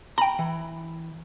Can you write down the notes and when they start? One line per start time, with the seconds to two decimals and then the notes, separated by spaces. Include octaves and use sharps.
0.18 G5 A#5 B5
0.39 E3